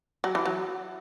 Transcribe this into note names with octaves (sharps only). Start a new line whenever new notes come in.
F#3
E3
F#3